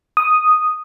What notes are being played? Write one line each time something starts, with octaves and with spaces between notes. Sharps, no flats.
D#6